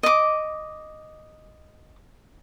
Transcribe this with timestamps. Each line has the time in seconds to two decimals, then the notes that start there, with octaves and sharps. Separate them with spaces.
0.03 D#5 D6